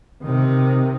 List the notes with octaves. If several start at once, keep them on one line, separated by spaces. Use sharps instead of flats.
C3 D#3